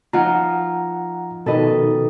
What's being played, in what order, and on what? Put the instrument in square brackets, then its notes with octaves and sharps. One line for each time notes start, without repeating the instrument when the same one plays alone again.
[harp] F3 D#4 F4 [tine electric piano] F#5 A#5
[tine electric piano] B2 D#3 [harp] A4 B4 D#5